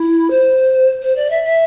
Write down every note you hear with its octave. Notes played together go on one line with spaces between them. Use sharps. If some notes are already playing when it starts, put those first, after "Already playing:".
Already playing: E4
C5
C5
D5
E5
E5